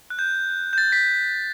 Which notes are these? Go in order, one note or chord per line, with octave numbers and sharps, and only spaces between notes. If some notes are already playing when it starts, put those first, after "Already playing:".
F#6
G6
G6
A6
B6